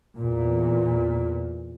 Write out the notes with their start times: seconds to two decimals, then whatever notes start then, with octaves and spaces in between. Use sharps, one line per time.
0.17 E2 A#2